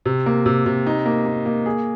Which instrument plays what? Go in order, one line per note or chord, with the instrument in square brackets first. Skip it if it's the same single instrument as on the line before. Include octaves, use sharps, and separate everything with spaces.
[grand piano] C3
A#3
C3
C3
D#4
A#3
A#3
A#3
G#4